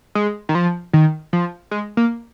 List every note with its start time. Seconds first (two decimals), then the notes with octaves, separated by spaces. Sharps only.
0.15 G#3
0.49 D#3
0.55 F3
0.93 D#3
1.33 F3
1.71 G#3
1.97 A#3